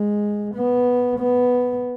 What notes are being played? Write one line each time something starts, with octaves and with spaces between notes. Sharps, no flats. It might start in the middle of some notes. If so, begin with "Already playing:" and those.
Already playing: G#3
B3
B3